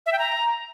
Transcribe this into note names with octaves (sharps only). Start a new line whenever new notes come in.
E5
G5
A#5